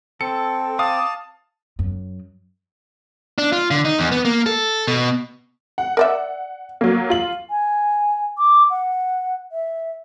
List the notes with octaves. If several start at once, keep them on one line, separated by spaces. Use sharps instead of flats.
C4 A4 C#7
F5 A5 D6 D#6
F#2
D4
F4
D3
D#4
E2
B3
A#3
A4
B2
F#5
A#4 D5 E5
F#3 A#3
F4 F#7
G#5
D6
F#5
E5